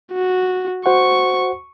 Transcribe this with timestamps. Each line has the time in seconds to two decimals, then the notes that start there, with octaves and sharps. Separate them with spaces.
0.13 F#4
0.86 F#4 C5 F#5 C#6